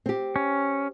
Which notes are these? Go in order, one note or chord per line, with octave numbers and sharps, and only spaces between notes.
C4 G4
C#4